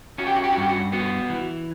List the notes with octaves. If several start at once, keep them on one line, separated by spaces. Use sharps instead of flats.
C#4 F#4
G4
F#4
G4
F#4
G2
G4
F#4
B3 F#4
E3